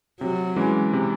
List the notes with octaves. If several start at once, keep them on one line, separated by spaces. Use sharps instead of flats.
C3 F#3
E3 G#3 C#4
C3